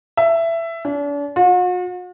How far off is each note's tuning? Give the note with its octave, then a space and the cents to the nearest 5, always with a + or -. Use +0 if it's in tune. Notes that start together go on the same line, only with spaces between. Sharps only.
E5 +15
D4 -40
F#4 -45